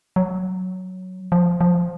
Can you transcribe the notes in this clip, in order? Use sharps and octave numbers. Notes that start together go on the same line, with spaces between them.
F#3
F3
F3